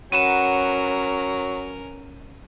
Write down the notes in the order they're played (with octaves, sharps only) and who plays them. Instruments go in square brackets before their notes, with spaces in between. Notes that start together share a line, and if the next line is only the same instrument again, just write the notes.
[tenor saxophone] F#3 [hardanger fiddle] C#4 A#4 [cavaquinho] F#4 B4 F#5 [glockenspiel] D#7 E7